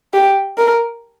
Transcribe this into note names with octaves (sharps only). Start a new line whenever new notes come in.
G4
A#4